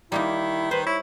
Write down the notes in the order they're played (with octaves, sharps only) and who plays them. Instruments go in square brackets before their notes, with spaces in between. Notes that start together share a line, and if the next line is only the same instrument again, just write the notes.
[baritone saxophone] D#3 [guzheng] G3 A#3 D#4 [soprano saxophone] E4
[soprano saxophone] B4 [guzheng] C5
[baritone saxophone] E4 [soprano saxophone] C#5